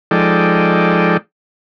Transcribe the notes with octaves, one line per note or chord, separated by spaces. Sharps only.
F3 G#3 D#4 A4 D5 G5